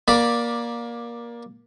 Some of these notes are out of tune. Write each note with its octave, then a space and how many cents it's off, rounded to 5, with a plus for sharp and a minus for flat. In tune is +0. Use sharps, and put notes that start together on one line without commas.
A#3 +20 D5 +0 B5 -15